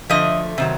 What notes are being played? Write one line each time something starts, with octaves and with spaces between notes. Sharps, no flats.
D3 F3 A3 D#5
C3 D#3 F#3